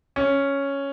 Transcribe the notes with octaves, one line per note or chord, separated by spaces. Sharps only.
C#4